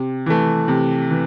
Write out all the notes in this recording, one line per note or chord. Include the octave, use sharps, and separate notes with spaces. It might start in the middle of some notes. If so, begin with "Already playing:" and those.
Already playing: C3
E3 A3
C3
E3